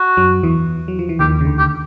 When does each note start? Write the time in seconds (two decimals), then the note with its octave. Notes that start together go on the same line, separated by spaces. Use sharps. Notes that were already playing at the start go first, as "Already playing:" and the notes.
Already playing: F#4
0.17 F#2 F#3
0.43 E2 E3
0.88 F#3
0.99 F3
1.09 E3
1.20 D#2 D#3 G4
1.41 C#3
1.45 D2 D3
1.59 G4